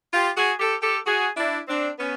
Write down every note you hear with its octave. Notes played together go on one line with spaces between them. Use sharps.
F4 G4
F#4 G#4
G4 A4
G4 A4
F#4 G#4
D4 E4
C4 D4
B3 C#4